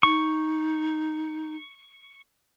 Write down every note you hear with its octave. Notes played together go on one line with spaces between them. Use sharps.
D#4 C#6